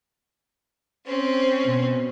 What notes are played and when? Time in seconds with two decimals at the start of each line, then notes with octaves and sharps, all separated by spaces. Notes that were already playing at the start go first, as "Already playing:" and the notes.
1.07 C4 C#4
1.62 B2